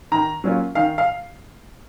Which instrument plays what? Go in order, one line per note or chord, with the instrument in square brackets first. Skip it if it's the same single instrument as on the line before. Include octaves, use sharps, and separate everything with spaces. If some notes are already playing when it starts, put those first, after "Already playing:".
[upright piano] D#3 A#5
F#3 A#3 C#4 F4
D#3 F5
F5